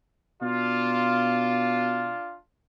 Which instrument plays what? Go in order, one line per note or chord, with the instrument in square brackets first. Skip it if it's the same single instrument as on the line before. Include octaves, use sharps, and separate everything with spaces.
[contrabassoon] B2 [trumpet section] D4 F4